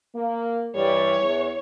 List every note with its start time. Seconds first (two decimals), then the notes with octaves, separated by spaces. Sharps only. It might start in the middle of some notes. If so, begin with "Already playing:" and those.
0.14 A#3
0.74 G2 E3 G3 C#5
1.20 E2